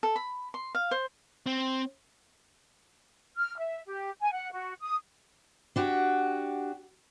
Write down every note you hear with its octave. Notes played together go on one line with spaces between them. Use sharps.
A4
B5
C6
F5
C5
C4
F6
E5
G4
G#5
F#5
F#4
D#6
D4 F#4 G4